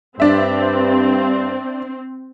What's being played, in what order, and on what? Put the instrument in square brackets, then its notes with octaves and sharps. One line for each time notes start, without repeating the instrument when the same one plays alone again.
[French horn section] G2 [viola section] C4 [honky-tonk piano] D4 E5